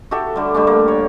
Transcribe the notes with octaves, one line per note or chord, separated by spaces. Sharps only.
F#4 G4 A4 E5
D3 G3
G3 A3 D4
A#3
C#5